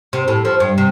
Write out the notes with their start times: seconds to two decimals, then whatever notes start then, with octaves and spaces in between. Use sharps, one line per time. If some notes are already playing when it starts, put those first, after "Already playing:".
0.13 C3
0.28 A2
0.45 F3
0.60 G2
0.78 C3